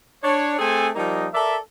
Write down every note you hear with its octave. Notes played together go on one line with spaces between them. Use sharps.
D4 C#5
A3 C4 G#4 A4 C5 G#5
F3 G3 A#3 D#4
A4 A#4 D5 E5